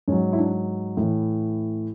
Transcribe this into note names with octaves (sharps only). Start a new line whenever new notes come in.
G#2 F#3 C#4
E4
D4
A2 E3